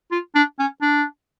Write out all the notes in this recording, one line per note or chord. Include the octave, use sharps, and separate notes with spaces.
F4
D4
C#4
D4